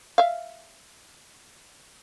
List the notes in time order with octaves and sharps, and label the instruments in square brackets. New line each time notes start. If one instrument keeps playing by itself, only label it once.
[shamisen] E5 F5